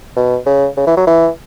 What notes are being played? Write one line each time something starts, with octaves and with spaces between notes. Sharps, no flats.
B2
C#3
C#3
E3
F#3
E3